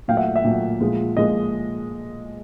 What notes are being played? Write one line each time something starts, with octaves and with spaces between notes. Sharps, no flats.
A#2 F#3 A3 F5 G5
E5 F#5
E5
A#2 F#3 A3
A#2 F3 G#3
A#2 F3 G#3 D#5